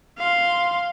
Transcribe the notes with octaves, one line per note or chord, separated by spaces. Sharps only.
F5 C6